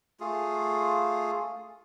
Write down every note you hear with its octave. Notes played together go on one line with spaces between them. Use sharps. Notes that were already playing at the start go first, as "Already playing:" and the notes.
A3 F4 G#4